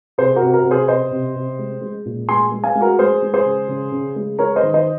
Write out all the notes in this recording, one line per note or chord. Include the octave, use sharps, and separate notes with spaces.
C3 G#4 C5
F#4 A#4
C3
F#4 A#4
C3
G#4 C5
C3 C5 D#5
C3
C3
G#3
G#3
A#2
G#3 G#5 C6
G#3
F5 G#5
G#3
F#4 A#4
G#3 G#4 C5
G#3
G#4 C5
C#3
C#3
C#3
G#3
G#3 A#4 C#5
C5 D#5
D#3
C5 D#5